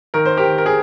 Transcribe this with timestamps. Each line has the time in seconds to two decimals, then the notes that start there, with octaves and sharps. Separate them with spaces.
0.14 D#3 A#4
0.25 C5
0.37 G4 A#4
0.43 D#3
0.58 A#4
0.66 G#4